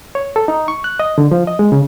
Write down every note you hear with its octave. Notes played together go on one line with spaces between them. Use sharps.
C#5
A4
D#4
C#6
F#6
D#5
D3
F3
D#5
G#3
C#3